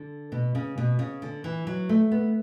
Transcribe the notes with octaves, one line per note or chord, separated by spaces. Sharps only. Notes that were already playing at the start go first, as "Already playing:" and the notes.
Already playing: D3
B2
C#3
B2
C#3
D3
E3
F#3
A3
B3